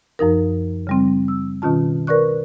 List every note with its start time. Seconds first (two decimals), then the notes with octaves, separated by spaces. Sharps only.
0.19 F#2 F3 D#4 A#4
0.87 C#3 G3 C4
1.28 E6
1.62 B2 D#3 C#4 F4 A5
2.07 A#4 B4 D5 C#6 F#6